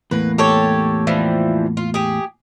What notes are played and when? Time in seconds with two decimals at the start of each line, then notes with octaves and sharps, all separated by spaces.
0.11 E2 A2 A#3 B4
0.38 G4 A4 C#5
1.07 E3 F3 G3
1.77 F4
1.94 G4 G#4